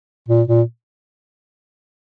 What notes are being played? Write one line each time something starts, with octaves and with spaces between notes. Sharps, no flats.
A#2
A#2